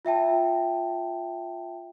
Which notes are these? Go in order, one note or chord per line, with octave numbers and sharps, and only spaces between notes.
F4 E5 G5 A5